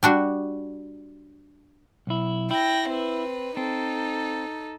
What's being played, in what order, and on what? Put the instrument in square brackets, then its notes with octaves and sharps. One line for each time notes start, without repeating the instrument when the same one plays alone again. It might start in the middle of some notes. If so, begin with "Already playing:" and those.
[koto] G3 D4 F#4
[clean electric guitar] B1 E4
[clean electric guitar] E4 [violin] G5 A#6
[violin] C4 B4
[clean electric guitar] C4 [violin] D#4 A4